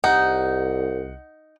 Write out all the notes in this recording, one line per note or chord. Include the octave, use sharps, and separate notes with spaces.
C2 D#4 F#5